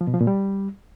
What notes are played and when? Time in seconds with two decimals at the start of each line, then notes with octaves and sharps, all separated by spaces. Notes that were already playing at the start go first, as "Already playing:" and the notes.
0.01 F3
0.07 B2
0.14 F3
0.21 A#2
0.27 G3